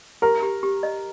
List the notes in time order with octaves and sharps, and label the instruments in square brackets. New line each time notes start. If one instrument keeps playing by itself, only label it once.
[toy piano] G4 [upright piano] A#4
[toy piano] G4
G4
D#5